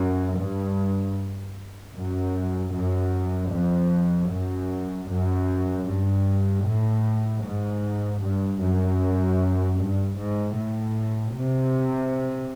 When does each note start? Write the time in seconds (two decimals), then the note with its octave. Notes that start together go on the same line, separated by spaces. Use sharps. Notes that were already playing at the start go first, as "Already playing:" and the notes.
Already playing: F#2
0.39 G2
1.95 F#2
2.73 F#2
3.51 F2
4.30 F#2
5.08 F#2
5.86 G2
6.65 A2
7.43 G#2
8.21 G2
8.60 F#2
9.78 G2
10.17 G#2
10.56 A2
11.35 C3